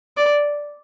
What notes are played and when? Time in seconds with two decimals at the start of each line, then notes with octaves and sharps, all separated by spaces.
0.17 D5